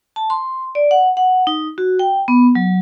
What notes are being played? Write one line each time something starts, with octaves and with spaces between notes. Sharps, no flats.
A5
C6
D5
F#5
F#5
D#4
F#4
G5
B3
F#3